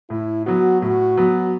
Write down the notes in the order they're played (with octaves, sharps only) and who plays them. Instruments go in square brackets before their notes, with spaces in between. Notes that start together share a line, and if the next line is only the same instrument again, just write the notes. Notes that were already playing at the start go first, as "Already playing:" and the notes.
[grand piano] A2 [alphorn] E4
[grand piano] F#3 B3 [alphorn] F#4
[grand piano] A2 [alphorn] F#4
[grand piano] F#3 B3